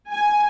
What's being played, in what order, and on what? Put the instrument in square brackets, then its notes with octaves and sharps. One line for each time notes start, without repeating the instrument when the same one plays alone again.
[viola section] G#5